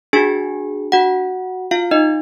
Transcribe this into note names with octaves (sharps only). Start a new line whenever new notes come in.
D4 F#4 G#4 G#5
F#4 F#5
F4 F5
D#4 D#5